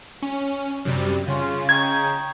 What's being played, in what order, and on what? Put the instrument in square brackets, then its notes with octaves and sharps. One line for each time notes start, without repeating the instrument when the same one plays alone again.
[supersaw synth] C#4
F#2 C3 G3
[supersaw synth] C#3 [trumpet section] C#4 F4
[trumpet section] D#4 G5 C#6 [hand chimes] G#6